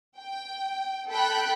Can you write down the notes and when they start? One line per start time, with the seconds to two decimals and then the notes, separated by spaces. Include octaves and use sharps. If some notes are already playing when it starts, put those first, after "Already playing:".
0.18 G5
1.09 A4 G5 B5 F#6